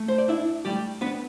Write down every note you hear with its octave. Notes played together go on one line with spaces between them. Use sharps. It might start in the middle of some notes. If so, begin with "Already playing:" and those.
Already playing: A3
C5
D5
D4 E4 E5
G3 A3 G4
B3 D4 B4